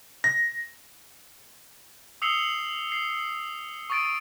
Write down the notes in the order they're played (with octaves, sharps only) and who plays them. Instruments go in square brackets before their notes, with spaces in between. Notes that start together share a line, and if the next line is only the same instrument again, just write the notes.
[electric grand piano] A#6
[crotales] D#6 E6 C7 C#7 F7 G7
C7
C#6 D#6 A6 D7